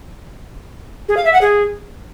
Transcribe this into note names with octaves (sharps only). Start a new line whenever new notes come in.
G#4
F5
E5
F#5
G#4